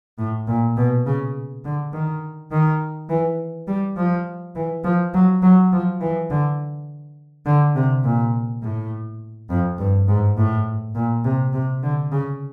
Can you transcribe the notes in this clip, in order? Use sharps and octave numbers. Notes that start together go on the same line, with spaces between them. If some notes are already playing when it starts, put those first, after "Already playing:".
A2
A#2
B2
C#3
D3
D#3
D#3
E3
G3
F3
E3
F3
F#3
F#3
F3
E3
D3
D3
C3
A#2
A2
F2
G2
G#2
A2
A#2
C3
C3
D3
C#3